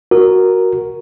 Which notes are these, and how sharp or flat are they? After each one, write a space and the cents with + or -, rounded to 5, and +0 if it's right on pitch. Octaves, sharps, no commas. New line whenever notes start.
F#4 +0 A#4 +0